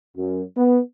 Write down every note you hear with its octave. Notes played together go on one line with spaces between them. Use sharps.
F#2
B3